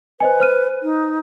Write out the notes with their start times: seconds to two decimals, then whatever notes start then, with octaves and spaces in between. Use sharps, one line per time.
0.20 B4 C5 D#5 G#5
0.40 C5 F6 D#7
0.83 D#4